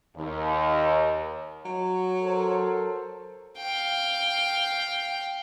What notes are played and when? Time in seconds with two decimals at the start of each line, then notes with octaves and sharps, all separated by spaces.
0.17 D#2
1.65 F#3
2.21 A4 A#4 C5
3.57 F5 G5